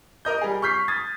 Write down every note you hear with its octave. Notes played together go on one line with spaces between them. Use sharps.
A#4 D#5 G6
G3 G#4
C#6 F6 G6 B6 C7
D#6 G#6 A6